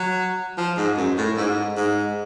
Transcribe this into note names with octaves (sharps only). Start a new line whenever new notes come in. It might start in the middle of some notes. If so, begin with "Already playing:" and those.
Already playing: F#3
F3
G#2
F#2
A2
G#2
G#2